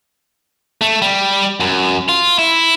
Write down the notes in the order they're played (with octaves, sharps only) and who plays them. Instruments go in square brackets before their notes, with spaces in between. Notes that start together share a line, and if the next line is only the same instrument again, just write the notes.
[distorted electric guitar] A3
G3
F#2
F4
E4